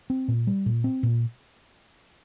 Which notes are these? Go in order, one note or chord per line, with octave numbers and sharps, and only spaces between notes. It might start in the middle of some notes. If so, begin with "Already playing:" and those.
C4
A#2
G3
A#2
C4
A#2